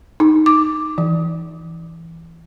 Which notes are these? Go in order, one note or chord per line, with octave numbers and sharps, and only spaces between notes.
D#4
D6
E3